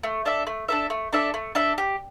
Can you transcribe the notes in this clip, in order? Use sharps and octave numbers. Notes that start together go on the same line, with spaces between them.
A3
D4 A4 E5
A3
D4 A4 E5
A3
D4 A4 E5
A3
D4 A4 E5
G4